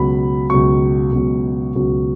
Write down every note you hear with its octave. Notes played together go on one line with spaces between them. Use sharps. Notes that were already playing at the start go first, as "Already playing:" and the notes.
Already playing: C#2 B2 F#3 B5
C#2 B2 F#3 C#6
C#2 B2 F#3
C#2 B2 F#3